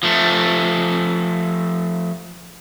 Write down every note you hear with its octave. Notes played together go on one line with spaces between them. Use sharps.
F3 A3